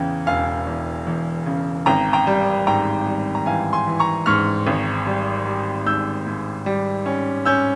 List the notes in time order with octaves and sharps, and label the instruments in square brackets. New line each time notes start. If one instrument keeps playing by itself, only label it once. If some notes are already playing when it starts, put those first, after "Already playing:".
Already playing: [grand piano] E2 C#3 E3 G5
E1 F5 G#5
E2
E2
C#3
G#1 G5 A#5
G5 A#5
G3
G#2 G5 A#5
G3
A#5
E3 F5 G#5
G#5 C6
E3
A#5 C#6
G#2 C#6 F6
G#1
G3
G3
G#2 E6 G6
G#2
G3
C#4
C#4 E6 G6